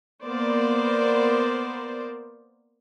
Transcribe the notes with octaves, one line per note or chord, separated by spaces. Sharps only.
A#3 B3 A#4 C5 D5